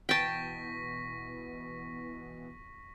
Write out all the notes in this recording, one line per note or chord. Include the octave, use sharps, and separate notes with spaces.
B2 E3 B3 G5 A5 C#6 A#6 B6